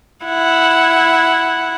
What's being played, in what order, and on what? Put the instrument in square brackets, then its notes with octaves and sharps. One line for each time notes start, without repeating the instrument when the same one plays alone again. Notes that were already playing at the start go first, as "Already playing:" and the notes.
[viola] E4 F#5